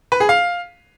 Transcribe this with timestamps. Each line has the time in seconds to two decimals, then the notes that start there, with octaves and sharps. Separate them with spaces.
0.12 B4
0.20 G#4
0.29 F5